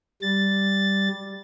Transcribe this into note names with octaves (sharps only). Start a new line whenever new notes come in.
G3 A6